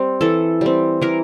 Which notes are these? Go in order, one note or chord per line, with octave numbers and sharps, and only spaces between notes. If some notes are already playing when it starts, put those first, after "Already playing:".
Already playing: G3 C4
E3 A4
G3 C4
E3 A#4